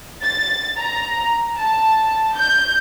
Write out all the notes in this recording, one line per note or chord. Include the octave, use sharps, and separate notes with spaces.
A6
A#5
A5
G6